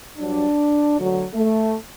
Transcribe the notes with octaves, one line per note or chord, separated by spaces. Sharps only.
G2 F#3 D4
D2 D3 F#3
A3